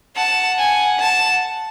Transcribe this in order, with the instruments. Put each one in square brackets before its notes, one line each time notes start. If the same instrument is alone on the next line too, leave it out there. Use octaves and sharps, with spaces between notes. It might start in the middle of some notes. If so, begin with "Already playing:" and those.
[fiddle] F#5 [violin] A5
[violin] G#5
A5